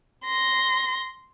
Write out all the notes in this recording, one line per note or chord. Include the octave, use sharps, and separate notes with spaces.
C6 A#6